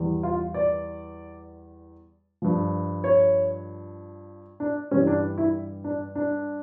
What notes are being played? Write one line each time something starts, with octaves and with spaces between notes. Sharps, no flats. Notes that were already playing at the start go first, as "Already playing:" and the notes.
Already playing: E2 E3 G3
F4
D5
G2 F3
C#5
D4
G2 E3 G3 C#4
D4
E4
D4
D4